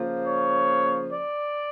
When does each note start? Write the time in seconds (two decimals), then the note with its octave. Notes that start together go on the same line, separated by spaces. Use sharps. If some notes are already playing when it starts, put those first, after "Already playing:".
Already playing: C#3 F3 A#3
0.26 C#5
1.12 D5